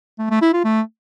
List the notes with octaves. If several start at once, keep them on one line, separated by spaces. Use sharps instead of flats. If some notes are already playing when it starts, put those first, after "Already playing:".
A3
A3
E4
F4
A3